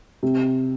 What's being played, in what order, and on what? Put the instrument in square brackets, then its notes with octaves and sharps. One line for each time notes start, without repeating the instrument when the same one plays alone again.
[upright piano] C3